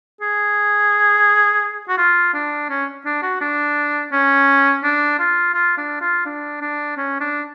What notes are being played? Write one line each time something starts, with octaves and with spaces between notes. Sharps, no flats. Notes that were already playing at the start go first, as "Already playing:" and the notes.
G#4
F#4
F4
D4
C#4
D4
F#4
D4
C#4
D4
F4
F4
D4
F4
D4
D4
C#4
D4